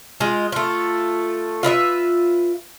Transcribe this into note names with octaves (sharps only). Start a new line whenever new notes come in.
G#3 F4
A3 F4
F4 B4 D#5 E5